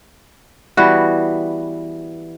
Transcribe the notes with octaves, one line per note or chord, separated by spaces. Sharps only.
E3 G3 B3 F#4